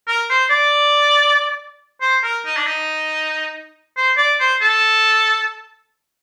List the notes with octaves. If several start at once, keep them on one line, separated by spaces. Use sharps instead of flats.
A#4
C5
D5
C5
A#4
D#4
D4
D#4
C5
D5
C5
A4